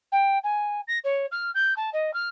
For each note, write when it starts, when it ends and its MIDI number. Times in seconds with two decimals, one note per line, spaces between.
0.12 0.38 79
0.43 0.81 80
0.87 0.98 94
1.04 1.26 73
1.31 1.50 89
1.54 1.73 91
1.76 1.90 81
1.93 2.13 75
2.13 2.28 89